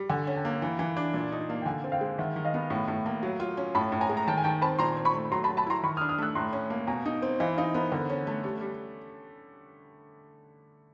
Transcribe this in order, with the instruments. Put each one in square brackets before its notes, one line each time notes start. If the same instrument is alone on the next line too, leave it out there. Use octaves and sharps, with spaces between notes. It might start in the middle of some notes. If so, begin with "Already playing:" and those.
Already playing: [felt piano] G3
[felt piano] D3 [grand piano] F#5 G#5
[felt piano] C#4
[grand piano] G5 A5
[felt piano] A#3
E3
E3
D4
A#2
D#4
A#3
[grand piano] G5
[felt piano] D3 [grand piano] F#5 G#5
[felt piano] C4
[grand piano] F5 G5
[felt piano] G#3
[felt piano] D#3 [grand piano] E5 F#5
[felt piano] D#3
[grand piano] D#5 F5
[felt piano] B3
A2
A2
A#3
F#3
F4
C#4
[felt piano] A2 [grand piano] A5 B5
[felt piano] A2
[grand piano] G#5 A#5
[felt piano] G#3
[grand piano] A#5
[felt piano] D#3 [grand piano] G5 A5
[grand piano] G#5
[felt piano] D#3 [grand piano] G5 A5
[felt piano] C4 [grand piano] A5 B5
[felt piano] A#2 [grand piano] A#5 C6
[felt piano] C4
[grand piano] B5 C#6
[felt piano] A3
[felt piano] F#3 [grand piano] A#5 C6
[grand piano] A5 B5
[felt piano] F#3
[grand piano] A5 B5
[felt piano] E4 [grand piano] A#5 C6
[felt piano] D#3 [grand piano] B5 C#6
[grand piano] D#6 F6
[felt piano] D4
[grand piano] D#6 F6
[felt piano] A3 [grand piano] E6 F#6
[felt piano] A2 [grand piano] A#5 C6
[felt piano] C#4
A#3
[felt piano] B2 [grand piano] G#5 A#5
[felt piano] D#4
C4
[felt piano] E3 [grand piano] D#5 F5
[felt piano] D#4 [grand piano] D#5 F5
[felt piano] B3 [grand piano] A#4 C5
[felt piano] D3 [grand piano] A#4 C5
[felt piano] C#4
A3
G3
G3